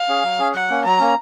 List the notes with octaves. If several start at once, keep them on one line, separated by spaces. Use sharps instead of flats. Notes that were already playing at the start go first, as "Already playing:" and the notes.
Already playing: F5
C#4 G#4
F#3
C#4 G#4
F#3 F#5
A#3 C#4
F#3 A#5
A#3 C#4